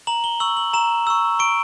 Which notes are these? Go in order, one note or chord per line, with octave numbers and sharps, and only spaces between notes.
A#5 F#7
G7
C#6 E6 F#7
F#7
A#5 E7
C#6 E6
C#6 D7